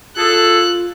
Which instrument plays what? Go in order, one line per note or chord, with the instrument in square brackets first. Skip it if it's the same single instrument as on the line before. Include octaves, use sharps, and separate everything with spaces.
[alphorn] F4 [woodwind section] G#4 A4 [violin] F#6